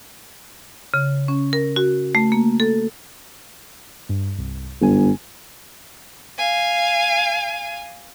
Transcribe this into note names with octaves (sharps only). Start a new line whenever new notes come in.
C#3
C#4
A#4
F#4
A3
A#3
A4
G2
C2
G1 F#2 G#5
F5 G#5